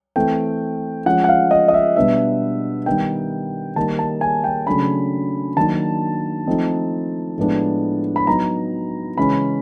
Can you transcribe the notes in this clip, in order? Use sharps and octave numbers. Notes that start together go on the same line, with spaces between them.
E3 A3 C4 G5
F3 G#3 C#4 F4 F#5
F#5
F5
D#5
D#5
E5
B2 G3 B3 D4 E5
D#3 G3 B3 D#4 G5
D#3 G3 A#3 D#4 A5
A5
G#5
G5
C#3 F#3 A3 D4 B5
D#3 F#3 A#3 D4 A5
F3 A3 C4 D#4
A2 F3 G#3 B3 D4
B5
F#3 B3 D#4 A#5
C#3 E3 G#3 C#4 B5